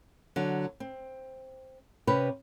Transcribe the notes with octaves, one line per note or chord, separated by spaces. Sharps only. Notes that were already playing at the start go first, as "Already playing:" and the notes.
D3 F#3
C4
C3 C#4 B4